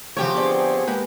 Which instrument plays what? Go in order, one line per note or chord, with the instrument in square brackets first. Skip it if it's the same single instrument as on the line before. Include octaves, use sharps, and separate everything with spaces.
[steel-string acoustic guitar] C#3 E3 A3 [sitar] F3 G4 C#5 [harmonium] F#4
[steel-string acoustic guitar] D3 D5 [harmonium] B3 G#4 [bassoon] C4
[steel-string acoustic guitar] G#3 A#3 G4 [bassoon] B4